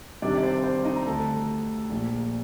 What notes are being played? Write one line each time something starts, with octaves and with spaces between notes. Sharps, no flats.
C2 C3 D#3 D4 D5
D5
C5
C5
D#4 D#5
A#5
D2 D3 A4 A5
A#1 A#2